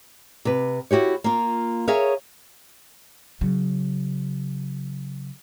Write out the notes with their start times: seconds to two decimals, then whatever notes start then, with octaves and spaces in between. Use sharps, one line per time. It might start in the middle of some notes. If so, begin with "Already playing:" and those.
0.45 C3 B4
0.91 E4 F#4 G4 C#5
1.24 A#3 F4
1.88 G#4 A#4 C#5 E5 F5
3.41 C#3 F#3